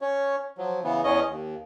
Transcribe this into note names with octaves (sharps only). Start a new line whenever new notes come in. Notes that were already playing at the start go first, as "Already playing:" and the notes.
C#4 C#5
F3 F#3
C#3 E3 B3
E2 C#4 D#5
D#2